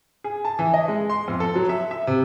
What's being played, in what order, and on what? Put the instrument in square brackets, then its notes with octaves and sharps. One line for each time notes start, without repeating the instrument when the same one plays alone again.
[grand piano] G#4
A5
E3
D#5
G#3
C6
F2
A4
F#3
E5
E5
C3